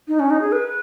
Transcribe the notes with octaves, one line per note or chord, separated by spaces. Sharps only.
D#4
C#4
D#4
G#4
B4